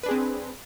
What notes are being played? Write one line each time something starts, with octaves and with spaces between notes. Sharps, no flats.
C4 D4 G#4 B4